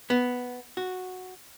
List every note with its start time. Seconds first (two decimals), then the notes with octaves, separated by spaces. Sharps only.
0.10 B3
0.77 F#4